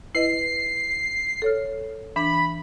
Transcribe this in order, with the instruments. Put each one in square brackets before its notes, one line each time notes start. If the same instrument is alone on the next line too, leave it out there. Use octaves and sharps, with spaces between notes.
[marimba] E4 B4 D#5 [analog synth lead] C7
[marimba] A4 C#5 F6
[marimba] E3 D4 [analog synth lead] B5